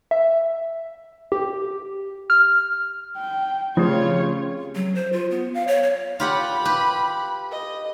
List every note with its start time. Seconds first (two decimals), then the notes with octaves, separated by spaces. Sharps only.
0.11 E5
1.32 G4
2.30 F6
3.18 G5
3.77 C#3 F3 A3 C4 F4 G4 C#5
4.76 F#3
4.95 C5
5.13 F4
5.31 B3
5.54 F5
5.68 C#5
5.83 C#5
6.20 F4 G4 F#5 B5
6.65 G4 B4
7.51 D#5